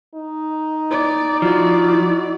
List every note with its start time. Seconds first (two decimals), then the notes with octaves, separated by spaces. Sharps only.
0.15 D#4
0.91 D5
1.42 F3 E4 F#4 D5